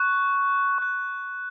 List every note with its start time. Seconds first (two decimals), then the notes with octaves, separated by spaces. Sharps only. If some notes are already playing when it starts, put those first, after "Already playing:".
Already playing: C#6 F#6
0.78 C#6 F#6